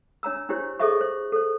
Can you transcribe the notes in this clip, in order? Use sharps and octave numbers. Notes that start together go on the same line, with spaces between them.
D4 C#5 A#5 E6
D4 E4 G4 C5 C#5
G#4 A4 C5 D#5 E5 C#6
C5
A4 C5